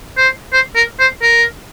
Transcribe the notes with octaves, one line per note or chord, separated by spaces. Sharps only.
C5
C5
A#4
C5
A#4